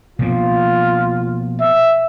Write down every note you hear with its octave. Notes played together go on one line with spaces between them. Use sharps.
B2 F3 A#3 F4
E5